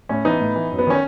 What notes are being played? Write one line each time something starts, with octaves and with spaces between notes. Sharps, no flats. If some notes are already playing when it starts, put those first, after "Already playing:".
A2 C#4
E3 B3 D#4
A2
E3
F#2
B3
D#3 C#4